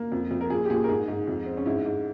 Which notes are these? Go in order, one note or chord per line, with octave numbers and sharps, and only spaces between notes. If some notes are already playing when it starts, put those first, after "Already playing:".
Already playing: A#3
F2
F2
A#4
A#2 G#4
G4
A#2 G#4
A#4
G#2 G#4
G#2
F2
C4
C#4
G#2 E4
G#2